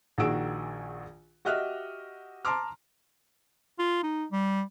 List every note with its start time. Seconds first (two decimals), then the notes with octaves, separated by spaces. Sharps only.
0.18 A#1 D#3 F#4 G#4 E6 D7
1.45 F#4 G4 D#5 E5 F6 F#6
2.45 A5 A#5 C6 D6 F6
3.79 F4
4.03 D#4
4.32 G3